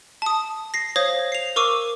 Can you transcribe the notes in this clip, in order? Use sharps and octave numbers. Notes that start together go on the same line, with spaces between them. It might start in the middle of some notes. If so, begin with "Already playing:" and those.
A5 D#6
A#6 C7
C5 C#5 F5 D#6 G#6 A#6
C7 F7
A#4 C#6 D6 E6 D#7